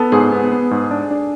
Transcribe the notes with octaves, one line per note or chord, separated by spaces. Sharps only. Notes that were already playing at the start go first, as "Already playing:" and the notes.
Already playing: B3 A4
G#2 G#4
B3
B3
G#2
D4
D4